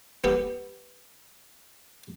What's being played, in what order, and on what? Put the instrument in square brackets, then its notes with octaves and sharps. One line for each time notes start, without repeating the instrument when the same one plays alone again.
[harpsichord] B3 G4 A4